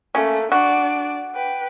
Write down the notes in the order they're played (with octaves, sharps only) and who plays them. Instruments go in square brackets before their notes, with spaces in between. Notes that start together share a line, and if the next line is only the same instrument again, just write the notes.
[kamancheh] A3 A#3 [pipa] C#4
[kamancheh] D4 D5 [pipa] F#4
[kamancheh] B4 G5